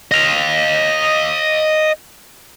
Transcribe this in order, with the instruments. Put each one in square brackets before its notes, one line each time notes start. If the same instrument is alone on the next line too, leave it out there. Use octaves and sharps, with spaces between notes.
[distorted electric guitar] D#5 F5